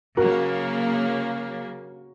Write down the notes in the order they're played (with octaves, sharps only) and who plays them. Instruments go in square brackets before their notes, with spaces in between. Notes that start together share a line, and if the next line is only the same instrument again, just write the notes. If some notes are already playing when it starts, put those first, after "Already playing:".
[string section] C#3 F#3 A#3 [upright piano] F#4 A#4